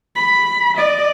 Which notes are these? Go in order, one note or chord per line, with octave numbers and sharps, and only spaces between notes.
B5
D5 D#5